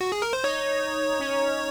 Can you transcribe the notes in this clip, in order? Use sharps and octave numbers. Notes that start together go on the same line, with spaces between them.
F#4
G#4
A#4
C5
D#4 C#5
C#4